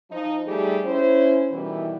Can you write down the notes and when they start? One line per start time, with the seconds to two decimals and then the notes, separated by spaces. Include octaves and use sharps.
0.11 F3 D#4
0.47 G3 A3 D#4 G4 G#4
0.84 C#4 E4 C5
1.51 B2 D#3 E3 G3 E4 F#4